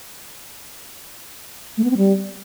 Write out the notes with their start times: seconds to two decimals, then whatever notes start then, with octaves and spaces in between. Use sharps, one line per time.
1.78 A3
1.84 B3
1.91 C4
1.97 G3